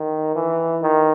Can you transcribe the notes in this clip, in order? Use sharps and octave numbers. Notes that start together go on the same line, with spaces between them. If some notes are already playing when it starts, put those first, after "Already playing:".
Already playing: D#3
E3
D#3